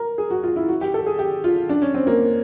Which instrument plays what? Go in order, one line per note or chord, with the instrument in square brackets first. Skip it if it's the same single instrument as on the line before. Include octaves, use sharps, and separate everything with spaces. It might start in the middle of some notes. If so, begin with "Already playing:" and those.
Already playing: [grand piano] A#4
G#4
F#4
F4
E4
F#4
G4
A4
G#4
G4
F4
D4
C#4
C4
A#3